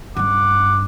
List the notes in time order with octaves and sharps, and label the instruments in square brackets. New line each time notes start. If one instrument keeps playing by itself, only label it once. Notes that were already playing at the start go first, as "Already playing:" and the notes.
[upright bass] G2 C#4 [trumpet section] F#5 D6